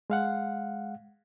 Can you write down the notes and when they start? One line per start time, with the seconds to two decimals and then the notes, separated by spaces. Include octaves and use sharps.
0.10 G#3 F5 F#5